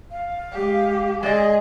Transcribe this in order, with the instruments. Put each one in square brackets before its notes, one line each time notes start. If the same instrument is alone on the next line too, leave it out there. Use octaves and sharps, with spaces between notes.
[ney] F5
[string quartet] G#3 G4
[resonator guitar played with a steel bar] G#3 D5 D#5 [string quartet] G#4